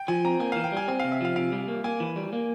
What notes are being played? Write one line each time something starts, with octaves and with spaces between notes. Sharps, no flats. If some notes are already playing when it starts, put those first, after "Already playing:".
Already playing: G5
F3 G#5
C4 A#5
A#3 G#5
E3 F5
G5
G3 G#5
C4 G#5
C3 F5
E5
F3 F5
C3 F5
G3
A#3
A#3 G#5
E3
G3
A#3